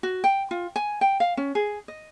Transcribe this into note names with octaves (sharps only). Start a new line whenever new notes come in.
F#4
G5
F4
G#5
G5
F5
C#4
G#4
D#5